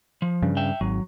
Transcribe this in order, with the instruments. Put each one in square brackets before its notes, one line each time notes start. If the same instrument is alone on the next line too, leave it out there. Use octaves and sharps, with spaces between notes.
[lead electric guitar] F3
[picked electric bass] G2 C#3
[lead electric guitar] E5 G5
[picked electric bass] G#1 [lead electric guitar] F#3